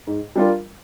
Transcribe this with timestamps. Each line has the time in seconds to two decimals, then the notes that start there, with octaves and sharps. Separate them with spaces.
0.07 G#2
0.36 G3 D4 F4 A#4